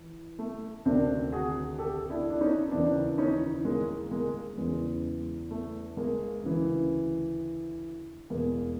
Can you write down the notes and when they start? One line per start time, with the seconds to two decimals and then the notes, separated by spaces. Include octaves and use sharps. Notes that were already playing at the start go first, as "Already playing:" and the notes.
Already playing: E3
0.39 A3
0.85 D2 C3 D#3 C4 D4
1.32 F#4 G#4
1.79 G4 A4
2.10 D4 E4
2.30 D4
2.41 C#4 D#4
2.71 D#2 C#3 E3 C4 D4
3.18 C#4 D#4
3.65 G#3 A#3
4.11 G#3 A#3
4.58 E2 C#3 E3 G#3
5.51 A3
5.97 G#3 A#3
6.43 D2 C#3 E3
8.30 E2 B2 G#3 A#3